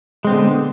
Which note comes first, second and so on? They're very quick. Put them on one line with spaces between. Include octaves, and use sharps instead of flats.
G#3 C4 B3 D3